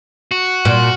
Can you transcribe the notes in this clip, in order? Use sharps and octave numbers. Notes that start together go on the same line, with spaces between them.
F#4
A#2